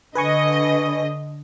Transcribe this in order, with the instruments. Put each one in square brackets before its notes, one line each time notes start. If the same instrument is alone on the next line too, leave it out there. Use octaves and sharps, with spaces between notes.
[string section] D3 D#5 [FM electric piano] B4 G#5 C#6